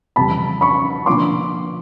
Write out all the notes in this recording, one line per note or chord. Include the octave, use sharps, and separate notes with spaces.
F2 C#3 E3 G3 A5 B5
B5 C#6
D3 F3 A#3 D4 F4 C6 D6